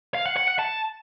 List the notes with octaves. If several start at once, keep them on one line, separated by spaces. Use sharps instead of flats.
F5
F#5
F#5
F#5
A5